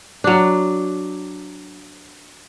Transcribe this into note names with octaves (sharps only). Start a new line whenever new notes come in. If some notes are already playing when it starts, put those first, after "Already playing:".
F#3 D4